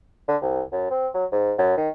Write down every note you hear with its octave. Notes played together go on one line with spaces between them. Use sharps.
D3
C2
F#2
C4
F#3
G#2
F#2
D#3